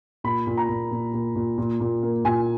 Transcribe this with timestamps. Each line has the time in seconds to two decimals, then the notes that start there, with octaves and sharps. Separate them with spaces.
0.24 A#2 B5
0.47 A#2
0.57 A#5
0.69 A#2
0.91 A#2
1.14 A#2
1.36 A#2
1.58 A#2
1.80 A#2
2.03 A#3
2.25 A#2 G#5